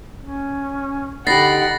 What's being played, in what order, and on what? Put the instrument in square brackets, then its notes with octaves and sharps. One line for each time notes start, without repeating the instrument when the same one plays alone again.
[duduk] C#4
[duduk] D3 [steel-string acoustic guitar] D#4 G4 [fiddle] F#5 B5 [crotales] A6 A#6 C7